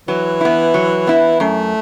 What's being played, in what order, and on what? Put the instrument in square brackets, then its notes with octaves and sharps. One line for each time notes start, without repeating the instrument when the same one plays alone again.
[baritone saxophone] E3 [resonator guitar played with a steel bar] F#3
[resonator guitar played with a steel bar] B3 E4
F#3
B3 E4
[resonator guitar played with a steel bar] F#2 [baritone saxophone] A3